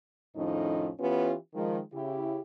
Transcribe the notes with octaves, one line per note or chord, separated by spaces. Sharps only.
F2 A2 D#3 F3 C#4 D#4
E3 B3 C#4 F4 G4 B4
D#3 F3 G#3
C#3 E4 G4